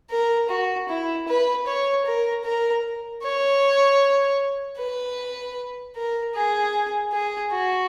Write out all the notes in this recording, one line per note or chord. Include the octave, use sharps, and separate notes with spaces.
A#4
F#4
E4
B4
C#5
A#4
A#4
C#5
B4
A#4
G#4
G#4
F#4